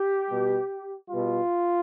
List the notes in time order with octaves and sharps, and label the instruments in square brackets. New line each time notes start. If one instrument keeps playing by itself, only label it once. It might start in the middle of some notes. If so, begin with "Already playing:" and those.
Already playing: [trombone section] G4
B2 G3
B2 G3 F4